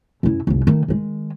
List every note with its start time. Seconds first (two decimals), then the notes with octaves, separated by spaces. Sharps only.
0.23 F#2 E4
0.47 F1 C2
0.67 D#3 A3
0.88 D#3 G#3